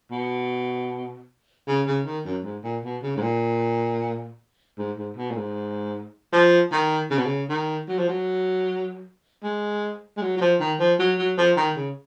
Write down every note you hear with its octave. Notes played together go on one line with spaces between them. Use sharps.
B2
C#3
C#3
D#3
F#2
G#2
A#2
B2
C#3
G#2
A#2
G#2
G#2
B2
A#2
G#2
F3
D#3
C#3
B2
C#3
D#3
F#3
F3
F#3
G#3
G#3
F#3
F#3
F3
D#3
F3
F#3
F#3
F3
D#3
C#3